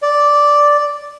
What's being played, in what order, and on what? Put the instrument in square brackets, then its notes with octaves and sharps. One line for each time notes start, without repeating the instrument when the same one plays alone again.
[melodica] D5